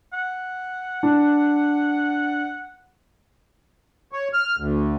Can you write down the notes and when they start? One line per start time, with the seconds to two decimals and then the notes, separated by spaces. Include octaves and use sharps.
0.13 F#5
1.03 D4
4.12 C#5
4.33 F6
4.59 D2